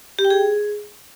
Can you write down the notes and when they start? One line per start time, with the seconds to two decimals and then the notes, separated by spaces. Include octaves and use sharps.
0.19 G4
0.25 G5
0.30 G#4